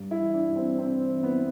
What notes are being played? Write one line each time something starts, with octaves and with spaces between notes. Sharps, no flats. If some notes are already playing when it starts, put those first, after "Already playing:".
Already playing: G2
E4
E3
D4
G2
C4
E3 C4
E3
B3